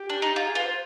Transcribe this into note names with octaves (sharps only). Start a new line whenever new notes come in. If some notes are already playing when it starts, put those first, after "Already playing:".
Already playing: G4
D4
D#4
F4
G#4
F4 B4
C5